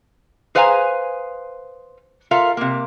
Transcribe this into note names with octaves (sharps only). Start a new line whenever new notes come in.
G#4 B4 C5 F5 G#5 A#5
F4 A4 A#4 E5 F5
C3 A#3